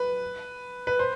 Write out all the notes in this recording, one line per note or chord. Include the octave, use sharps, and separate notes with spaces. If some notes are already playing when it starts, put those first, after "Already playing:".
Already playing: B4
B4
C5